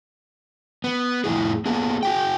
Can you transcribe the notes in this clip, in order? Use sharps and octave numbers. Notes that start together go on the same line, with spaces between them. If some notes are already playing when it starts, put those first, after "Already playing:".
B3
F2 A2 E4 G#4
A#3 B3 G#4
F#4 G#4 G5